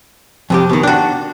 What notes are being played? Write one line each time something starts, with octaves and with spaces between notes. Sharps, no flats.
F2 C3 G4
B2 D#3
D4 F#4 G5